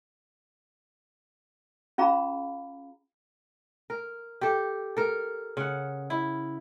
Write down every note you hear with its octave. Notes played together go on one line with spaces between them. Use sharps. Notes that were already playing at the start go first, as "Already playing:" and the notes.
C#4 F4 G#4 F5 A#5 B5
A#4
G4 A4
A4 A#4
C#3 F#5
E4